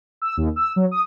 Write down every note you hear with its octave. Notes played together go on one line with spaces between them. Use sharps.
E6
D#2
E6
F#3
D#6